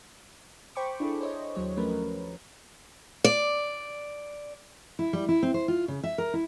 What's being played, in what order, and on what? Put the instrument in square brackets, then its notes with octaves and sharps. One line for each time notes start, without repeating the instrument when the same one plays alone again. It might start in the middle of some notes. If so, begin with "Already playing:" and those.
[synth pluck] C5 G5 B5 C#6 D6
D4 E4 G#4 A4
C5 C#5 D#5
D#2 F#3 C#5
F3 F#3 A3 C#4 A#4 B4
[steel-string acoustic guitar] D5
E4
G3
E4
C4
C5
F4
C#3
E5
A#4
E4